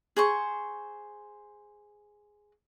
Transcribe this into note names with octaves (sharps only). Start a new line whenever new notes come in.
G#4 C5 C#6